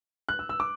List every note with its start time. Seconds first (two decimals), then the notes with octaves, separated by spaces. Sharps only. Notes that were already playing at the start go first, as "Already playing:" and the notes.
0.29 F#6
0.39 E6
0.49 E6
0.60 D6